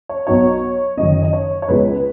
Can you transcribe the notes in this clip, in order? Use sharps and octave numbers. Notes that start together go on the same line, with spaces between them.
C#5
B1 B2 F#3 D#4 C#5
F#1 F#2 D#3 D#5
D#5
C#5
C#5
C#2 B2 G#3 B4